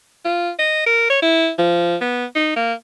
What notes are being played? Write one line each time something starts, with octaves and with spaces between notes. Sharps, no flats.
F4
D#5
A#4
C#5
E4
F3
B3
D#4
A#3